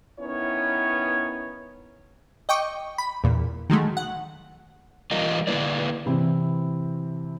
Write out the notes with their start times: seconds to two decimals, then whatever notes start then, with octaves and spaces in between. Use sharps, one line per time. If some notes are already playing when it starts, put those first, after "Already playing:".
0.20 D#3 B3 C#4 E4 C#5
2.49 D#5 G5 C#6 D6
2.98 B5
3.24 E2 A#2
3.70 D#3 F#3 G#3 A3
3.97 F#5
5.11 E3 G3 F4 A#4 D#5
5.47 D3 A#3 E4 B4 D5
6.06 C3 E3 C4 E4